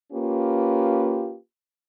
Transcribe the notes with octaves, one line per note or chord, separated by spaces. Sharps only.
A#3 C#4 F4 G4 B4